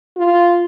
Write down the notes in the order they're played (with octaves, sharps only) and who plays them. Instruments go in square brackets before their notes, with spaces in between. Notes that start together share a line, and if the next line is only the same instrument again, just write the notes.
[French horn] F4